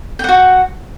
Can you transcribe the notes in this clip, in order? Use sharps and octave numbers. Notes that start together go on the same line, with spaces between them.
F#4 F#5 G5